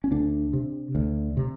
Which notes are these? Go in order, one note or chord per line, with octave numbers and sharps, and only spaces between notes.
C#4
D2 D4
C3
D2
C3